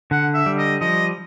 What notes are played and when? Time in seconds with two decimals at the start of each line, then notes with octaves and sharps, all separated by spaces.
0.11 D3 F#5
0.34 E5
0.46 G3
0.58 D#5
0.81 F3 D#5